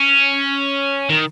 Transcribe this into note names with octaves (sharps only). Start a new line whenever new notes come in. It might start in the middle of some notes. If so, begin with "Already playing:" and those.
Already playing: C#4
D#3